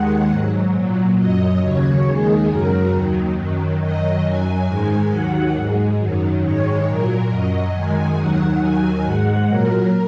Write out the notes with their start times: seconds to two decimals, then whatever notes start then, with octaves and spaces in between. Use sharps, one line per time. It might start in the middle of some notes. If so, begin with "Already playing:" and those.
Already playing: D#2 D#3 G#3 F#5
0.30 G#2 F#3
0.74 A#2 F#3
1.17 F#2 F#3 D#5
1.61 D#2 C#3 F#3 C#5
2.05 D#2 D#3 G#3 G#4
2.48 F#2 C#3 F#3 A#4
2.92 D#2 D#3 F#3
3.36 F#2 D#3 F#3
3.80 F#2 D#3 F#3 D#5
4.24 F#2 F#3 G#5
4.67 G#2 D#3 G#3
5.11 D#2 D#3 F#3 F#5
5.55 G#2 G#3
5.98 F#2 D#3 F#3
6.42 G#2 D#3 G#3 C#5
6.86 A#2 F#3 A#4
7.30 F#2 F#3 D#5
7.73 F#2 D#3 G#3 G#5
8.17 D#2 D#3 F#3 F#5
8.61 D#2 D#3 F#3 G#5
9.04 G#2 G#3 F#5
9.48 A#2 F#3 A#4